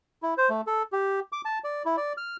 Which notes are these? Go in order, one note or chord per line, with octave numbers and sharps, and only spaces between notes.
E4
C5
A3
A4
G4
D6
A5
D5
E4
D5
F6